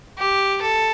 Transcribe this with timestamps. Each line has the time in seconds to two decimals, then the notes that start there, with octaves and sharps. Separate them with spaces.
0.19 G4
0.61 A4